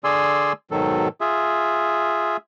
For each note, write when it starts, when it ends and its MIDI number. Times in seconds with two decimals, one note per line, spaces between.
0.04 0.53 50
0.04 0.53 68
0.04 0.53 74
0.04 0.53 80
0.04 0.53 84
0.04 0.53 88
0.71 1.08 44
0.71 1.08 47
0.71 1.08 51
0.71 1.08 54
0.71 1.08 69
1.21 2.37 65
1.21 2.37 68
1.21 2.37 76